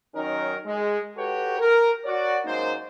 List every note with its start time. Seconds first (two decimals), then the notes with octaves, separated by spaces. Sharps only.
0.14 D#3 F#3 C#4 D#4 A#4
0.65 G#3
1.16 F#4 G4 A4 B4 C#5 G5
1.58 A#4
2.04 F#4 C#5 D5
2.45 F#2 G#3 A#3 D#4 C5